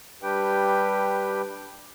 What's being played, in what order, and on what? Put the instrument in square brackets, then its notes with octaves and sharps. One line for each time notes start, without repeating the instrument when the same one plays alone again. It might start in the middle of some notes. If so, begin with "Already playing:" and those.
[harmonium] G3 D4 G4 B4 G5